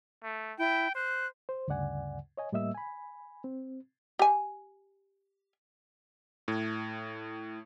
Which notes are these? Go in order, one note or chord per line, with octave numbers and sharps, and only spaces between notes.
A3
E4 G5
C5 F#6
C5
D2 G2 C#3 D5 F#5 G#5
C#5 D#5 G#5
A2 G3 A#3 D#5 E5 E6
G#5 B5
C4
G4 G#5
A2